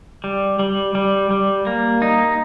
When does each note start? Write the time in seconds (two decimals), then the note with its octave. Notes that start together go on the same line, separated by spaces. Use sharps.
0.24 G3
0.59 G3
0.95 G3
1.31 G3
1.67 A#3
2.02 D#4